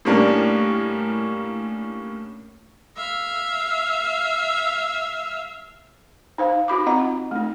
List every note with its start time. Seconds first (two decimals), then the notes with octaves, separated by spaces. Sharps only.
0.05 A2 G3 A#3 C#4 D4
2.97 E5 F5
6.38 D#4 C5 F5
6.68 D#4 F#4 B5 D6
6.86 C4 F4 D#5 F#5 A#5
7.31 A3 D#4